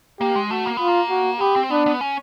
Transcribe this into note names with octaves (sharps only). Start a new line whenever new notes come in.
A#3 G4
G#3
A3 F#4
A#3
B3 F4
A#3
F#4
B3 G4
C4
B3 D4
B3
C#4